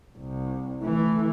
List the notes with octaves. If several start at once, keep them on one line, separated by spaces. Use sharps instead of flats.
C2
E3 A3